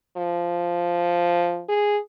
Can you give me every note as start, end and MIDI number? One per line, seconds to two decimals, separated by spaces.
0.17 1.63 53
1.69 1.99 68